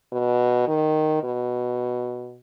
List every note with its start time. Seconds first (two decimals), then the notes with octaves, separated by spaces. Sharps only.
0.12 B2
0.68 D#3
1.23 B2